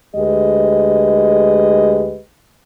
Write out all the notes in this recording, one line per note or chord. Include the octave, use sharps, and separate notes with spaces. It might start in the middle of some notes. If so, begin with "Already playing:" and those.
D2 G#3 G4 B4 D#5